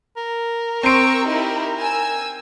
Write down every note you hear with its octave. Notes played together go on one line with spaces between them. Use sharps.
A#4
C4 A#5 C6 C#6 E6 D7
D#4 E4 G4
G#5 E6